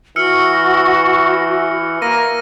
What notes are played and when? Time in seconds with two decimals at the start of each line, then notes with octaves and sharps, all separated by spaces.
0.16 E3 F#4 E6 F6 C#7
2.02 A#3 A#6 D#7